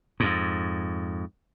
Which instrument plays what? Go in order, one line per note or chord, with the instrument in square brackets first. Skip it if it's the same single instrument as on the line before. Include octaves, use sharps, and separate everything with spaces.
[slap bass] F2 G#2